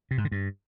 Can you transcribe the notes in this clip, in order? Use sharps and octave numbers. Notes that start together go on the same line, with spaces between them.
C3
G#2
D3
G2